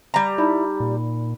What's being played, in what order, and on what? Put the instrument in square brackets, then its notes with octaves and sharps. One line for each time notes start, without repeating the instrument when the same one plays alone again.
[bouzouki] G3 A#5
[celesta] D#4 D5 B5 [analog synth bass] E4
[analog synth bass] A#2